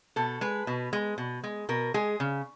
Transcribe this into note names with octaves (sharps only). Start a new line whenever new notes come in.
B2 A4
G#3 B4
B2
G#3
B2
G#3
B2 A#4
G#3 G#4
C#3